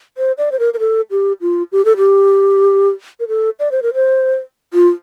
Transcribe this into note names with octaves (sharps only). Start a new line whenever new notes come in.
C5
D5
C5
A#4
A#4
A4
G4
F4
G4
A4
G4
A#4
A4
D5
C5
A#4
C5
F4